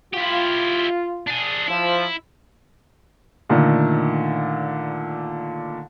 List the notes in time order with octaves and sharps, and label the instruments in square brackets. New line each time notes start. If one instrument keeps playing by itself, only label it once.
[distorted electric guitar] E4 G4 [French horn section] F4
[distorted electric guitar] D4 G#4
[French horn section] F3 [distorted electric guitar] E4
[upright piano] A#2 D3 D#3 A3